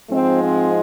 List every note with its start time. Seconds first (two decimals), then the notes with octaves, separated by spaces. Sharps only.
0.10 G#2 F3 G#3 C4
0.41 C4